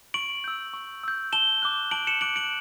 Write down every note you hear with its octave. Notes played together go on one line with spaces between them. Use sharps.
C#6 D7 F#7
E6 G6
C#6
E6 G6
A5 E7 G7
D6 F#6
A5 D7 F#7
C#7 E7
D6 F#6 D7 F#7
D7 F#7